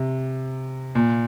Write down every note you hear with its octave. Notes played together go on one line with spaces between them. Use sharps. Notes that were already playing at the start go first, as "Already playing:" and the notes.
Already playing: C3
A#2